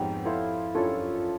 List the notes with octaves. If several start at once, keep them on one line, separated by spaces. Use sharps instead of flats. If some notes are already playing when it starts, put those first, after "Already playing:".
Already playing: F2 G#2 B3 C#4 D#4 G4
E4 A4 C5 F5
F#2 D4 F4 A4 C#5